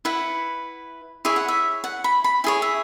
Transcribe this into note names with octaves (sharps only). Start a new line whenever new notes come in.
E4 B4 F#5
E4 G#4 C#5 E5
F#5
E5
F#5
B5
B5
E4 G#4 C#5 G#5
E5